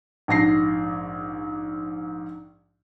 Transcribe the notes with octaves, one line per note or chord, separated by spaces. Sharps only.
A#1 G#2 A#6 C7